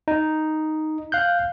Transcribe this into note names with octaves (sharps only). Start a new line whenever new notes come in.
D#4
F5 F#6 G6